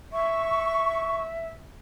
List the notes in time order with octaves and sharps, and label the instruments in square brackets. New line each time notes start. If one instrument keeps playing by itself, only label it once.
[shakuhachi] E5 [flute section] C#6